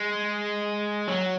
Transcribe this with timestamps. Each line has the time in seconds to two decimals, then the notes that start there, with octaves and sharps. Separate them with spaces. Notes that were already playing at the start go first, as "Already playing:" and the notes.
Already playing: G#3
1.08 F#3